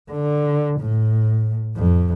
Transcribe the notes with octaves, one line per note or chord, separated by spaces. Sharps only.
D3
A2
F2